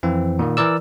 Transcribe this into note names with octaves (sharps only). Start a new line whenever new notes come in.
F2 E3 C4
A#2 D#3 A#3
E3 A#4 D5 E6